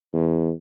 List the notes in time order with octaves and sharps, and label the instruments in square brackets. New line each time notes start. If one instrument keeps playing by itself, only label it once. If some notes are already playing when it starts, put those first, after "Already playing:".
[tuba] E2